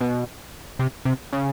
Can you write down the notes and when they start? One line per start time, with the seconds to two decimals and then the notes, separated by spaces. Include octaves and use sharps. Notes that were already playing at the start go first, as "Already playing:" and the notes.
0.01 B2
0.79 C3
1.05 C3
1.33 C#3